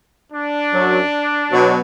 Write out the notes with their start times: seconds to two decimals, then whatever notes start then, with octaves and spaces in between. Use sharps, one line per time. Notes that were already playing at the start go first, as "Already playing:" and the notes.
0.31 D4
0.72 F#2 F#3
1.51 B2 F#3